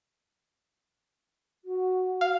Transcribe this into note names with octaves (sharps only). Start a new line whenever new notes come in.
F#4
F5